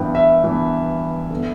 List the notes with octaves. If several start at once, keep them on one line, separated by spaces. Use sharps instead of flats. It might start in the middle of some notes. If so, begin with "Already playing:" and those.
Already playing: G2 E3 B3 G5
E5
G2 E3 B3
D3 B3